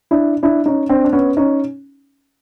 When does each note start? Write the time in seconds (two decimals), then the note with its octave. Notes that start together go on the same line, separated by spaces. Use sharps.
0.11 D4 E4
0.43 D4 E4
0.66 C#4 D#4
0.89 C4 D4
1.04 D4
1.13 B3 C#4
1.37 C#4 D#4